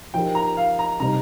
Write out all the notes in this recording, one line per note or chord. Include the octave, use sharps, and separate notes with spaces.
F3 D#4 G4 A#4 G5
A#5
F5
A#5
C3 G3 D#4 A#5